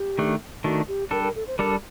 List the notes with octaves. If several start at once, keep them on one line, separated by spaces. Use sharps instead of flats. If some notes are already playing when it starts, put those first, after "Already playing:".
Already playing: G4
D#3 A3 D4
D#3 A3 D4 F#4
G4
G3 D4 A4 A#4
A#4
A4
C5
G3 D4 A4 A#4